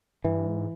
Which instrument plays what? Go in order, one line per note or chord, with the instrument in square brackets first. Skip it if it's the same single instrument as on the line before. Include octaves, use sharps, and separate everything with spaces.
[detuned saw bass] G2 [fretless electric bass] E3
[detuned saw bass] G#2